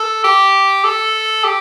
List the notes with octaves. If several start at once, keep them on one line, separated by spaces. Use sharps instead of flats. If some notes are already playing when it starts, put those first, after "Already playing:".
Already playing: A4
G4
A4
G4